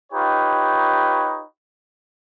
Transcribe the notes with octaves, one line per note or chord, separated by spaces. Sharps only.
D#4 F4 G4 B4 C#5